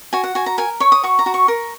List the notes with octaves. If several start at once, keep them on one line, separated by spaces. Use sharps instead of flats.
F#4 G#5
F#5
F#4 G#5
A#5
A#4 G#5
C#5 C#6
D#6
F#4 C#6
A#5
F#4
C#6
A#4